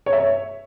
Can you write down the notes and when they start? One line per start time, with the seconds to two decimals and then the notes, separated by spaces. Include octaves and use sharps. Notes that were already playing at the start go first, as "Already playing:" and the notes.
0.06 C#5
0.13 E5
0.19 C#5